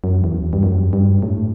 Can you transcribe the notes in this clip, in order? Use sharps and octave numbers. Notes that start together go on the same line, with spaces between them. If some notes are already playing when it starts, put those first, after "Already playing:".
F#2
E2
G2
F#2
G2
A2